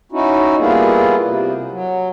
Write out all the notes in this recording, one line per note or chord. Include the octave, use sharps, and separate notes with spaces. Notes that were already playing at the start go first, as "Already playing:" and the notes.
C#4 D#4 E4 F#4
G3 A#3 B3 E4 F4 G#4
C3
F#3